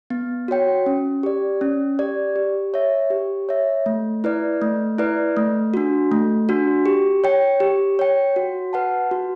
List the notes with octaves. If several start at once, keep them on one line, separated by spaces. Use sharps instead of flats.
B3
F#4 C#5 G5
C#4
G4 D5
C#4
G4 D5
G4
C#5 E5
G4
C#5 E5
A3
E4 B4 D5
A3
E4 B4 D5
A3
D4 F#4
A3
D4 F#4
G4
C#5 G5
G4
C#5 G5
F#4
B4 F#5 A5
F#4